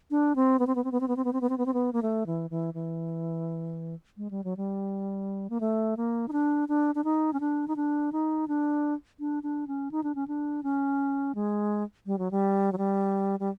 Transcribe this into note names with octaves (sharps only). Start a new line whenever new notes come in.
D4
C4
B3
C4
B3
C4
B3
C4
B3
C4
B3
C4
B3
C4
B3
C4
B3
A#3
A3
E3
E3
E3
G#3
G3
F#3
G3
A#3
A3
A#3
D#4
D4
D4
D4
D#4
C#4
D4
D#4
D4
D#4
D4
D4
D4
C#4
D#4
D4
C#4
D4
C#4
G#3
G3
F#3
G3
F#3
G3
G3